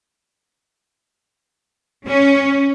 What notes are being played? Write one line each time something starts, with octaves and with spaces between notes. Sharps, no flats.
C#4